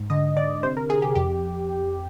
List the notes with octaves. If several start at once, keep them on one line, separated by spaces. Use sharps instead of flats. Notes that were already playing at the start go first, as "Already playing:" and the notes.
Already playing: G#2
D3 D#5
D3 D5
C3 C5
A#4
C3 G#4
G4
F2 G4